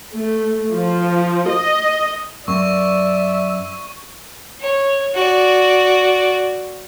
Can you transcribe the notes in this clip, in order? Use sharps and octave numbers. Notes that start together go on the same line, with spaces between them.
A3
F3
D#5
F#2 D5 E5 C#6
C#5
F#4 D5